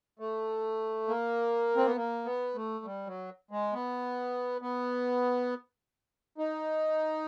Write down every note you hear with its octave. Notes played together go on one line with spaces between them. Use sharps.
A3
A#3
C4
B3
A#3
B3
A3
G3
F#3
G#3
B3
B3
D#4